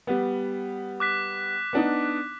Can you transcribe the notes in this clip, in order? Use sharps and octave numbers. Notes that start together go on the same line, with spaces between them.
G3 B3
D6 F#6 B6
B3 D4 D#4